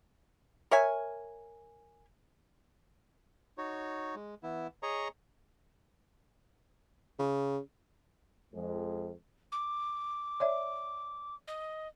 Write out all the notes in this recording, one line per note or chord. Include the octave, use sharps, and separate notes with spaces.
A#4 C#5 E5 G#5
D#4 F#4 C#5
G#3
E3 B3 E4
G#4 C#5 D#5 A#5 C#6
C#3
F2 G#3
D6
C#5 D5 E5
D#5